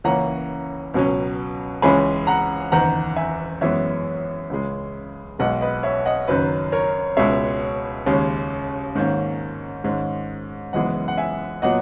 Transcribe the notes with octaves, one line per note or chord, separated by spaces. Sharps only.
C#2 C#3 E3 A#3 C#4 F#5 A#5
C#2 B2 F#3 C#4
C#2 C#3 E3 G#3 C#4 G#5 B5
F#5 A#5
F#1 E2 D#3 F#5 A#5
E5 G#5
F#2 E3 G#3 B3 C#5 E5
C#2 C#3 G#3
B1 B2 G#3 D#5 F#5
B4 D#5
C#5 E5
D#5 F#5
F#1 F#2 D#3 F#3 B4
A#4 C#5
C#2 B2 G#3 C#5 E5
D#2 C#3 G#3 C#4
G#2 D#3 A#3 C#4
G#2 D#3 G#3 C#4
F#1 F#2 E3 G#3 B3 D#5 F#5
F#5
E5 G#5
A#2 F#3 B3 D#5 F#5